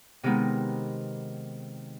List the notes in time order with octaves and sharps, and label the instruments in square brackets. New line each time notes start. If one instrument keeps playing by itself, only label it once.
[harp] C3 D#3 G#3 B3 D#4